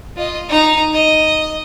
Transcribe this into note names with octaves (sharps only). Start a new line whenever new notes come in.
F4 D#5
D#4 A#5
D#5